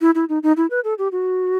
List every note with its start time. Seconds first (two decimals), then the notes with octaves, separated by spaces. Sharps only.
0.01 E4
0.15 E4
0.29 D#4
0.43 D#4
0.57 E4
0.71 B4
0.84 A4
0.98 G4
1.12 F#4